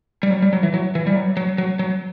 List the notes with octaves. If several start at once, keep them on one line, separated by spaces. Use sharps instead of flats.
G3
F#3
G3
F#3
E3
F#3
E3
G3
F#3
F#3
F#3
F#3